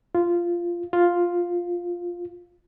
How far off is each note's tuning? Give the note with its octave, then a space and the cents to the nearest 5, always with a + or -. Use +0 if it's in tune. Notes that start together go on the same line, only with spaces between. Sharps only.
F4 -10
F4 +5